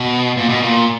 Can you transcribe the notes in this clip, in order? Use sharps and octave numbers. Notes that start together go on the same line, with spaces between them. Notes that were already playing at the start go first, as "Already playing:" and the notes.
Already playing: B2
A#2
B2
A#2